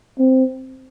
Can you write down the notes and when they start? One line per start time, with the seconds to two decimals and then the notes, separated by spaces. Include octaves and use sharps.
0.19 C4